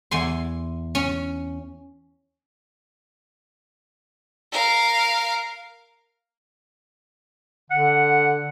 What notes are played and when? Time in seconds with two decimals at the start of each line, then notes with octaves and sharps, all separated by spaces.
0.11 E2 G#5 C6
0.95 C#4
4.52 A#4 F5
7.71 D3 F#5